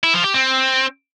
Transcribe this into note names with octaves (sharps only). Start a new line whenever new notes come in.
E4
F3
G4
C4